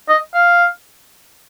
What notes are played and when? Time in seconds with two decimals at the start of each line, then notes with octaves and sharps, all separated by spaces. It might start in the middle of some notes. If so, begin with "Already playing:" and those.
0.09 D#5
0.34 F5